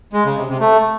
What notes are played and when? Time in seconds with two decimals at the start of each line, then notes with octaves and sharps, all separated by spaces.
0.13 G#3
0.25 C#3
0.37 C3
0.48 C3
0.60 A3